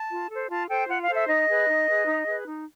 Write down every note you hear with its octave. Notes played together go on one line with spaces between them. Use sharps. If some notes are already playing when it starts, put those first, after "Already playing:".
Already playing: A5
F4
A4 C5
F4 A5
A4 C5 G5
F4 F#5
F5
A4 C5
E5
D#4 D#5
G#4 B4
D#4
G#4 B4
D#4
G#4 B4
D#4